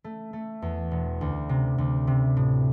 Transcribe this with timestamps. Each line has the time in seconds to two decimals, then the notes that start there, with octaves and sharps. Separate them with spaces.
0.04 A3
0.33 A3
0.62 E2
0.91 E1
1.21 D2
1.49 C3
1.78 D2
2.07 C3
2.37 A2